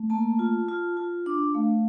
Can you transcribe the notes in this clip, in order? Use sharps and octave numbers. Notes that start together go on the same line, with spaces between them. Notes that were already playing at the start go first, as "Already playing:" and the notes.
Already playing: A3
A#3 A5
F4
F4
F4
D4 D6
A3 F5